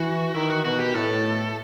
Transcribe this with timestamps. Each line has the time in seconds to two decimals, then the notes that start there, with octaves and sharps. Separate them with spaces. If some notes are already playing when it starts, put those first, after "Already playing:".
Already playing: E3 F#4
0.34 D#3 E4
0.50 F#4
0.65 B2 F#4
0.79 G4
0.94 A2 A4